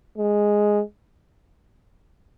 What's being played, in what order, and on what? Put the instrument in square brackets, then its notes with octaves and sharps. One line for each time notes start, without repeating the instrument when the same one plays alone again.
[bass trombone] G#3